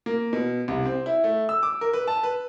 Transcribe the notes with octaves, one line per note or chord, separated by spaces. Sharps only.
A#3
B2
C2
C4
E4
A3
E6
D6
A#4
B4
A5
B4